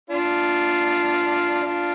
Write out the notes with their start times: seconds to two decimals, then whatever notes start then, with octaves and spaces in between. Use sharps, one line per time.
0.10 D4 F4
1.62 D4 F4